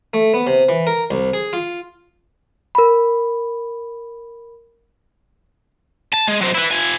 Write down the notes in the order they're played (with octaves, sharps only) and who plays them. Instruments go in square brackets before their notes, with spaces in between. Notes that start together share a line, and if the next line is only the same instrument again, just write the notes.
[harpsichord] A3
B3
C3
E3
A#4
C2
G#4
F4
[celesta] A#4 B5
[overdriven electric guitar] A5
G#3
F#3 C4
E4 B4
F3 G#5